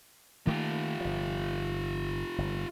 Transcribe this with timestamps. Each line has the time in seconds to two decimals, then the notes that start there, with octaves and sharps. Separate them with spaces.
0.47 D#3 A3 A#3 F4 G4
1.00 G1 F3
2.38 G1